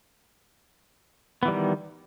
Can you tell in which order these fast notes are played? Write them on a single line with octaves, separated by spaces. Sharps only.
B3 E3 G3 D#3